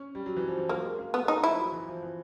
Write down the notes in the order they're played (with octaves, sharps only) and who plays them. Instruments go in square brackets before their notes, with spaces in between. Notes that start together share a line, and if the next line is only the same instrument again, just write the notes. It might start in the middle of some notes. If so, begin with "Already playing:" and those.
Already playing: [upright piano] C#4
G3
F#3
E3
F3
F3
[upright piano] F#3 [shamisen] A#3
[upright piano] G#3
A#3
[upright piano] A3 [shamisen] B3
[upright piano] G#3
[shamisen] D#4
[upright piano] G#3
[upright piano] F3 [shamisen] E4
[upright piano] F#3
E3
F3
E3